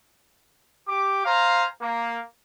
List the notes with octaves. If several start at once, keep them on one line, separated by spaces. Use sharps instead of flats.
G4 D6
C5 F5 G#5 A#5
A#3